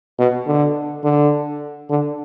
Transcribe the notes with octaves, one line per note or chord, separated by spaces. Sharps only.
B2
D3
D3
D3